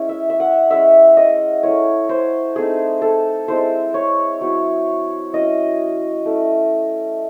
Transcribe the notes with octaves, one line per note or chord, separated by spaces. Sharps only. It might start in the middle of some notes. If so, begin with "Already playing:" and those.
Already playing: G#3 C#4 E4
E5
E5
F#5
G#3 C#4 E4 E5
D#5
A3 C#4 E4 C#5
C5
A3 C4 D#4 G#4
A4
G#3 C4 E4 C5
C#5
F#3 C4 E4
F#3 C#4 E4 D#5
A3 C#4 E4